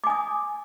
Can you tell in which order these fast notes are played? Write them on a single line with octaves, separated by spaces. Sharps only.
D6 G#5 D#6